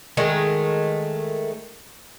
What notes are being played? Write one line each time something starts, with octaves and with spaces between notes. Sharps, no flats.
D#3 G#3 A3